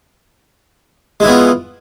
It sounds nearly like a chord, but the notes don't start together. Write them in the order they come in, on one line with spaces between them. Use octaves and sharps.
G#3 E4 E3 B3 F4